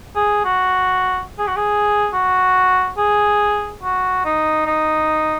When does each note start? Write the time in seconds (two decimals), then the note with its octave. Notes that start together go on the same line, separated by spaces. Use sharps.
0.16 G#4
0.45 F#4
1.38 G#4
1.48 F#4
1.56 G#4
2.13 F#4
2.98 G#4
3.83 F#4
4.25 D#4
4.67 D#4